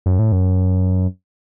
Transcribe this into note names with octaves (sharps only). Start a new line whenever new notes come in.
F#2
A2
F#2